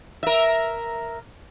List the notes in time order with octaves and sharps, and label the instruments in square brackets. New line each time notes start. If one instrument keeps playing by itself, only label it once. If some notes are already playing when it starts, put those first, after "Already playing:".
[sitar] A#4 E5